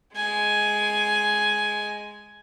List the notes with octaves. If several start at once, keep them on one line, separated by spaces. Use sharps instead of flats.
G#3 G#5